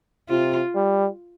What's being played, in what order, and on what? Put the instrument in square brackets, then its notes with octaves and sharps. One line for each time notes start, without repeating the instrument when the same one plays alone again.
[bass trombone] C3 [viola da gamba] F4
[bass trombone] G3